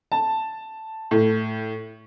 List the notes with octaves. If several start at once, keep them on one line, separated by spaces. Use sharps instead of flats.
A5
A2